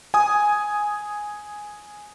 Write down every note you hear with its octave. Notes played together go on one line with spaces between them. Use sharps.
G#5 D#6